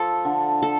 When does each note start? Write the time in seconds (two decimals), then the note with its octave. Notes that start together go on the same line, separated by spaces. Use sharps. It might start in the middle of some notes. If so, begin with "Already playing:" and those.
Already playing: F3 A4
0.25 D3
0.62 A4